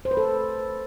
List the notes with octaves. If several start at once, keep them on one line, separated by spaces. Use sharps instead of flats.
C5
B4
A4